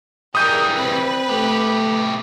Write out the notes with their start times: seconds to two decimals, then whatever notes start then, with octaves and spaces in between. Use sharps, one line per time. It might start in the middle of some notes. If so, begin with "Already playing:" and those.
0.35 E3 G3 G#4 A#4 D#6 G6 D#7
0.76 C4 B4
1.30 B2 A3 G4